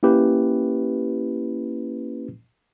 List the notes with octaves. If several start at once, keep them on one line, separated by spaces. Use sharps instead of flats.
A#3 C#4 E4 G4 B4